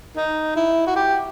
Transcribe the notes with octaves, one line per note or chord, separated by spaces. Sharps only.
D#4
E4
F#4
G4